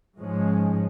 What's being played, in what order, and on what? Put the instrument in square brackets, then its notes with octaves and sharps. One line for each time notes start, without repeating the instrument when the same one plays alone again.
[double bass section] G#2 F3 G#3 C#4